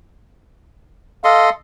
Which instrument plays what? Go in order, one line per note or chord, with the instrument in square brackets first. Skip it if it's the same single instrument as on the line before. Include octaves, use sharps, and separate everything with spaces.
[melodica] A4 D#5 C6 [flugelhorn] F5